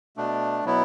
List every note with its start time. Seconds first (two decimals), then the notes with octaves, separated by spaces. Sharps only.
0.17 B2 A3 D4
0.64 B2 F#3 B3 E4